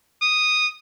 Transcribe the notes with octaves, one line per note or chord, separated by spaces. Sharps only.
D#6